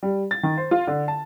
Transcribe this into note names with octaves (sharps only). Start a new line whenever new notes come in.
G3
A6
D#3
C5
F4
D3
A5